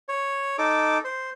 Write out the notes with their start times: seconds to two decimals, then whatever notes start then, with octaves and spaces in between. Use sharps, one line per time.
0.09 C#5
0.58 D#4 A4 D6
1.05 C5